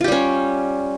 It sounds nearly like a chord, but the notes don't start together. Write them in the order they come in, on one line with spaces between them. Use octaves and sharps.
F4 G4 G3 C#4